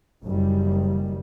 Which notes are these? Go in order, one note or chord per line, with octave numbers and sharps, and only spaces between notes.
F#1 D#3 G3